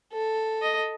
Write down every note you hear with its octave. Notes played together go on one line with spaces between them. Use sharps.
A4
D#5